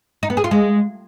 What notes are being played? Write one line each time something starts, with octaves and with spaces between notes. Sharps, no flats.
D#4
B3
G#4
F4
G#3